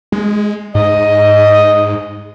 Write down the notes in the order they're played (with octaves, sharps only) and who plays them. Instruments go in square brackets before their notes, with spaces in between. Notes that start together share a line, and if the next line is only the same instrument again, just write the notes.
[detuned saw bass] G#3
[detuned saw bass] G#2 [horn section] D#5